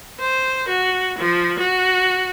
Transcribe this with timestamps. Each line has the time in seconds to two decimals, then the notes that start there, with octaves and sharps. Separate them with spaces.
0.19 C5
0.69 F#4
1.19 F3
1.59 F#4